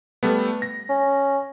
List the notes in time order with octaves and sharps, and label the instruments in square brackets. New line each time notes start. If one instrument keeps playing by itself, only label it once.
[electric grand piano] G3 A3 B3
A#6
[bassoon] C#4